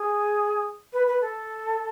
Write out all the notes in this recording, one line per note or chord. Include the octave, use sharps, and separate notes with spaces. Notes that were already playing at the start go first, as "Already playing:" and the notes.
Already playing: G#4
B4
B4
A4